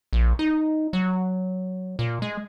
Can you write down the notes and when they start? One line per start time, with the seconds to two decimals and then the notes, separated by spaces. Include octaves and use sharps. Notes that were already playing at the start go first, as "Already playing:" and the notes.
0.13 A#1
0.39 D#4
0.93 F#3
1.99 A#2
2.22 G#3